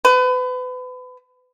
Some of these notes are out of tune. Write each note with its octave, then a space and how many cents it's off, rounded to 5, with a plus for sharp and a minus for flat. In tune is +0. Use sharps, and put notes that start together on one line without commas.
B4 +35